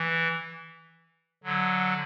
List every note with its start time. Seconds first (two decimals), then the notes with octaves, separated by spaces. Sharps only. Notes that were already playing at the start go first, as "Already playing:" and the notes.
Already playing: E3
1.44 D3 F#3